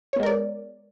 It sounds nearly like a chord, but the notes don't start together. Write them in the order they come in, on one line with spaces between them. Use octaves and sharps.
C#5 B3 G#3 A#4 D5